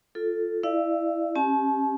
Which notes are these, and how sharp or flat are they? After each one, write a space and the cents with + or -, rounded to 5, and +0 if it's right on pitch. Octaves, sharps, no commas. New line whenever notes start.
F4 +0 A4 +0
E4 +0 D5 +25 F5 -40
C#4 -30 G4 +0 A5 -40